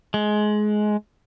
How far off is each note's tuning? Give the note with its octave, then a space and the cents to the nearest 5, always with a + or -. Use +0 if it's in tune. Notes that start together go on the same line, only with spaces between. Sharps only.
G#3 +20